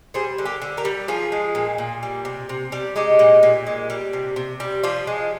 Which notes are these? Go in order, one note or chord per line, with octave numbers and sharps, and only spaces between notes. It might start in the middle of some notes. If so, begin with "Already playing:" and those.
G3 G#4 C5
D3
G4 A#4
D3
G4 A#4
G3
F3 F4 G#4
G#3
A#2
A#2
G3
C3
C3
G3
G#3 D#4 G4
A#2
A#2
G#3
G3
C3
C3
G3
F3 D4 F4
G#3